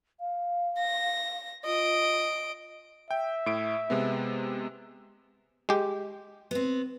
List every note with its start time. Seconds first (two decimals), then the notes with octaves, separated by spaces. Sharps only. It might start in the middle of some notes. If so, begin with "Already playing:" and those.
0.20 F5
0.80 A#6
1.66 F4 D#5 D7
3.11 E5 G5
3.46 A2 D7
3.90 C3 G#3 B3
5.69 G#3 G4
6.51 B3 C4